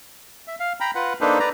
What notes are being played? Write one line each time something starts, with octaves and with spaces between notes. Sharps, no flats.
E5
F5
G5 A#5 B5
F4 B4 F#5
A#3 D4 D#4 A4 B4 C5
B4 D5 A#5